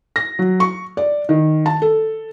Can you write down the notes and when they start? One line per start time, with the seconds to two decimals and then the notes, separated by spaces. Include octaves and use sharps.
0.16 A#6
0.39 F#3
0.60 C#6
0.97 D5
1.29 D#3
1.66 A5
1.82 A4